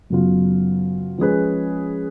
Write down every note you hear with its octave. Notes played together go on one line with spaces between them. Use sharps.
F#2 C#3 F#3 B3 F4
F3 G#3 C#4 G#4 B4